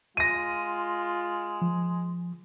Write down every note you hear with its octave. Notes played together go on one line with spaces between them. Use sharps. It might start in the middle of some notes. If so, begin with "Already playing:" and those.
G#3 F4 A#6 D#7
F3